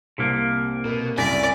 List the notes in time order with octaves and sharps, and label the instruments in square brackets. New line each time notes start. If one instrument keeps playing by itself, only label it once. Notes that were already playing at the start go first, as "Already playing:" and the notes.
[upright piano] C2 [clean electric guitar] C3 A#3
[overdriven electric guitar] B2 [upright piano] A#4
[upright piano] F#1 C2 B6 [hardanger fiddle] D5 [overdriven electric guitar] G#5